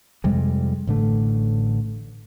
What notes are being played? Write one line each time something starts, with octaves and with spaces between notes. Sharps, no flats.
F2 C3 G3 G#3
A1 A2 D3 A3